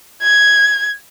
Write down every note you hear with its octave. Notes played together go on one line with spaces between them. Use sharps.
G#6